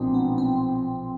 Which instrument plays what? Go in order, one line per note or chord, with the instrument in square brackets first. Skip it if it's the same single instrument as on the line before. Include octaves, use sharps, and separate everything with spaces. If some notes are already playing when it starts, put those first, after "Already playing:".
Already playing: [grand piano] B1 A#2 F3 [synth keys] G#3 C4 D4 D#4
[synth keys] B3
C4